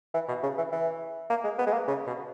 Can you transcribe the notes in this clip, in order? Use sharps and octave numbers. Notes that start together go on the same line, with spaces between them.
E3
B2
C#3
E3
E3
A#3
G#3
B3
G#3
A#3
C#3
B2